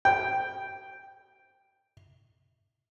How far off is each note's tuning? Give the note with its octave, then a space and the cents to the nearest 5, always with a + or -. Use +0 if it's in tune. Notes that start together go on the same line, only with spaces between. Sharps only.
G5 -5